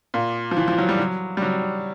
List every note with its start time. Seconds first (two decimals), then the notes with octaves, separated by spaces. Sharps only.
0.14 A#2
0.51 F3
0.57 E3
0.68 F3
0.78 F#3
0.89 G3
0.99 F#3
1.37 G3
1.42 F#3